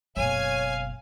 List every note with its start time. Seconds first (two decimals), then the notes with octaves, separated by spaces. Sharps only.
0.17 F#1 B2 C#5 F5 G#5